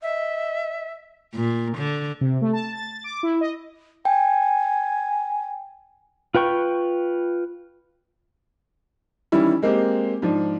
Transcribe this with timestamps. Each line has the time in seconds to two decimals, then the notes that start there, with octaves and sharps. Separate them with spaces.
0.02 D#5 E5
1.34 A#2
1.77 D3
2.21 C3
2.42 A3
2.53 A5
2.73 A6
3.04 D6
3.23 E4
3.41 D#5
4.05 G5 G#5
6.35 F4 B4 G5 C#6
9.32 D#3 E3 G3 C#4 E4
9.62 G#3 A#3 C4 G4
10.22 G#2 F3 D4